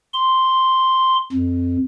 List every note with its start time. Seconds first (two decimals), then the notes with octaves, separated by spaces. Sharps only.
0.14 C6
1.33 F2